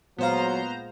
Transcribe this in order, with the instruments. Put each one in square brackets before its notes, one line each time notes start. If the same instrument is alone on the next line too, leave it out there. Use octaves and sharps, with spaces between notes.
[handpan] A#2 G#3 F5 [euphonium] F#3 [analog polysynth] B3 C5 A#5